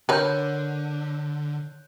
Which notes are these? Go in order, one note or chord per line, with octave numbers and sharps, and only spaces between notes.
D3 A#4 B4 C#5 F#6 G6